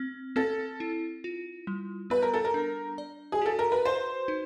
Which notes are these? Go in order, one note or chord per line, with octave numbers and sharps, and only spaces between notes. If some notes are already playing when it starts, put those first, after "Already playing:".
Already playing: C4
C4 A4
E4
F4
G3
B3 B4
A#4
A4
A#4
D4
D5
G#4
F#4 A4
A#4
B4
B4 C5
D#4